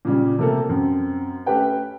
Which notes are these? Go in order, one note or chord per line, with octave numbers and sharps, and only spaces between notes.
A#2 C#3 G3
C3 A3 A#3 A4
F#2 C4
A3 C#4 G4 B4 G5